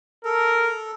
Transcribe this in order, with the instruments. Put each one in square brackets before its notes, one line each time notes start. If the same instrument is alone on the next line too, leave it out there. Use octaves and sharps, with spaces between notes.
[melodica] A4 [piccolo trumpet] A#4